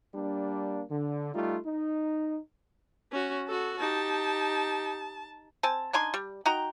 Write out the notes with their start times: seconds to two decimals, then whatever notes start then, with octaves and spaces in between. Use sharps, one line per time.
0.15 G3 A#3 D4
0.91 D3
1.35 G3 A3 D#4 F4
1.65 D#4
3.12 C#4 F#4
3.47 F#4 A4
3.80 D#4 G4 A5
5.63 C4 G#5 A5
5.93 D4 D#4 G#5 C6
6.14 G3
6.46 D#4 F#4 G5 A#5